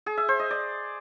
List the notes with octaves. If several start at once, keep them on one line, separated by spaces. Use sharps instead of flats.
G#4
E5
C5
D#5
D5